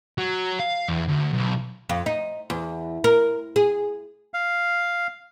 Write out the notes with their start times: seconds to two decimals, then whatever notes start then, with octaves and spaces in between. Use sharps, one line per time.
0.18 F#3
0.59 F5
0.88 E2
1.09 D2
1.33 B1
1.89 F2
2.06 D#4
2.50 E2
3.04 A#4
3.56 G#4
4.34 F5